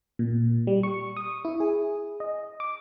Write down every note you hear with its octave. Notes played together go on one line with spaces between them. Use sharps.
A#2
G3
C#6
D#6
E4
G#4
D#5
D6